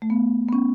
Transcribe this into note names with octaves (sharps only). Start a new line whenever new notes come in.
A3
B3
B3
C#4